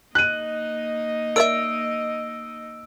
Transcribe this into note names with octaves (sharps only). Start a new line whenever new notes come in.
A#3 D#4 D#5 F#6 D#7
A#4 D5 E5 E6 D7